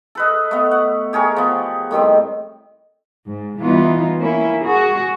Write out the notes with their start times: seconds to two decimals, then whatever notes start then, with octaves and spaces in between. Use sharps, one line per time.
0.15 A4 B4 D#5
0.51 A3 B3
0.71 F#5
1.13 G4 G#4 A#4 C#5
1.36 F3 B3
1.91 A2 D#3 G3 C4
3.26 G#2
3.61 E3 G3 B3 D#4 F4
4.17 A#3 C#4 E4
4.65 F#4 G#4